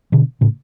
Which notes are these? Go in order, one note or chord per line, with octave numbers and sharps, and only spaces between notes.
B2 D3
A2 C#3